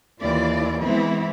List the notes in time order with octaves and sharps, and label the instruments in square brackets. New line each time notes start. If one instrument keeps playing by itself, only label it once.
[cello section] D#2 E3 F4 D5
E3 G#3 B3 C4 E4